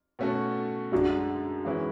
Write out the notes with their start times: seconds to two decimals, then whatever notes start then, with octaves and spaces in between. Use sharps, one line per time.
0.19 B2 A3 C#4 F#4 A4
0.92 F#2 D3 G#3 D4 F#4
1.65 G#2 E3 G#3 C#4 E4